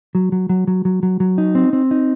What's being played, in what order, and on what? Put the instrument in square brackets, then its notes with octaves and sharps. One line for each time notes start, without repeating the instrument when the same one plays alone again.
[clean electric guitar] F#3
F#3
F#3
F#3
F#3
F#3
F#3
D#4
C4
C4
D#4